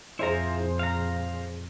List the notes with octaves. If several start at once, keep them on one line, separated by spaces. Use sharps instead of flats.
F2 A#2 E4 F4 G#4 C5 A#5
F5 A#5